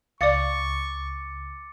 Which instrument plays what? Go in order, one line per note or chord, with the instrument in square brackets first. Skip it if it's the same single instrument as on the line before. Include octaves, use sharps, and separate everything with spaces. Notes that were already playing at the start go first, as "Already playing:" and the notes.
[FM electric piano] C#2 [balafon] D5 F5 [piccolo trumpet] C#6 [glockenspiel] D6 A6 C#7